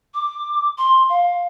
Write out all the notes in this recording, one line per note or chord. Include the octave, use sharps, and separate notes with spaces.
D6
C6
F5